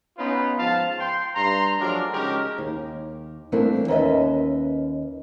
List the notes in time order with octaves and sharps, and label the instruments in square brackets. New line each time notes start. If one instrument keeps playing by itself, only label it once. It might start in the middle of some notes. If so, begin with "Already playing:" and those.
[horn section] B3 C#4 D#4 F4 B4
G#2 F3 F4 F5 A5
G5 C6
G2 A#5 C6
F3 F#3 G#3 A3 D4 A#4
C#3 G#3 C#4 D#4 G4 A#4
[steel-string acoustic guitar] D#2
G2 E3 A3 A#3 C4 D4
D#2 C#4 B4 D#5 E5